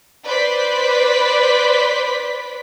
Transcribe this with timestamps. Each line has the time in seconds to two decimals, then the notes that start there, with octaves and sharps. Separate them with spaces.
0.24 B4 C5 D5 B6